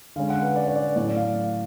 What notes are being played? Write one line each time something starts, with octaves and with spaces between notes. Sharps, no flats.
D3 G#3 C#4 F5
F#5
B4
D5
C#5
D5
A2 F#3 A3 D5
F5